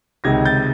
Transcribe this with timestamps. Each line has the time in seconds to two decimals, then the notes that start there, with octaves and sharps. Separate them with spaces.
0.24 C#2 C3 D#3 G#3 G#6 A#6
0.45 G6 A6